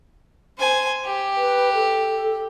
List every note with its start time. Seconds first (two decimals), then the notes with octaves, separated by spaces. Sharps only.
0.58 C5 G#5
1.05 G4
1.37 B4
1.75 A4